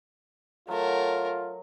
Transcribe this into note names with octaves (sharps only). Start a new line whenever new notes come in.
F#3 A3 F4 A#4